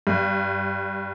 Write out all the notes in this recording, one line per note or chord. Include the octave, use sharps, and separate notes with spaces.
G2